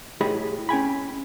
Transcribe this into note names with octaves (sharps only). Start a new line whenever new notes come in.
A2 G4 G#4 D#5 B5
C#4 G5 G#5 B5